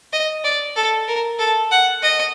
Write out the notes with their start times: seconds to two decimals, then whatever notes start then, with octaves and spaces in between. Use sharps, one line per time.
0.13 D#5
0.44 D5
0.76 A4
1.08 A#4
1.39 A4
1.71 F#5
2.02 D#5